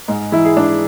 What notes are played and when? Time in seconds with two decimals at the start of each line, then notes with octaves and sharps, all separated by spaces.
0.08 G#2 G#3
0.32 E3 E4
0.45 G#4
0.56 G#2 D4